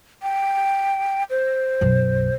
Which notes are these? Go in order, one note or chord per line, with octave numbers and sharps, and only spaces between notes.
G5
C5
B1 F#2